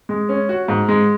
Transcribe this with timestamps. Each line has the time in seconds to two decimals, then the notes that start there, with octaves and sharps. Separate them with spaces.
0.09 G#3
0.29 C#4
0.49 F#4
0.68 G#2
0.89 G#3